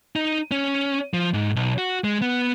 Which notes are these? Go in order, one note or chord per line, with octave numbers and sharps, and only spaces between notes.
D#4
C#4
F3
G#2
B1
F#4
G#3
B3